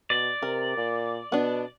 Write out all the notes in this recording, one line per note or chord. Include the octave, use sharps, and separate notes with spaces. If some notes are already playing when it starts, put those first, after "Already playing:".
B2 D5
C3 A#4
A#2
B2 B3 D4